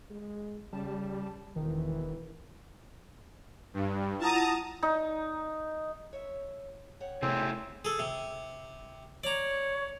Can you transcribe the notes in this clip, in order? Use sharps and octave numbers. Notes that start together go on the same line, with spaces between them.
G#3
C#3 G3 A5
E1 D#3 E3
G2
E4 F4 F#5 A5 A#5 D#6
D#4
C#5 E5
C#5 F#5 G5
C3 A3 C4 E4 G#4
G#4 A4
C3
C#5 D5 A#5